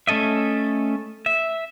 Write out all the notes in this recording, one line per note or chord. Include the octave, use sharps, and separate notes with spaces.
A3 C#4 A4 D#5 E5
E5